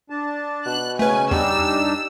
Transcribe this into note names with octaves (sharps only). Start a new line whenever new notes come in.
D4 A5
B2 F#6
C#3 A3 C#4 B4 G#5
E2 G3 D4 D#4 G4 E6